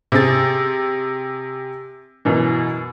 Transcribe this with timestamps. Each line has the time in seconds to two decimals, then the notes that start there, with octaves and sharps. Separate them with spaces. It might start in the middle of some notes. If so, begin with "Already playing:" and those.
0.12 C3 C4 G#4 A6
2.25 F#2 B2 E3